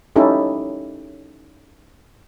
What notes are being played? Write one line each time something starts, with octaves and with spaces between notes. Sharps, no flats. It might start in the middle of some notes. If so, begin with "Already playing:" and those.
C#4 D#4 E4 G4 A4